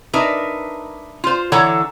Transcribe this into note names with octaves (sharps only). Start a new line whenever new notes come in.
D4 D#4 A#4 B4 E5
F4 C5
D3 E3 A4 C#5 F#5 A#5